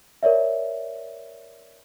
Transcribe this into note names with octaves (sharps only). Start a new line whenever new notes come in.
A#4 C#5 D5 E5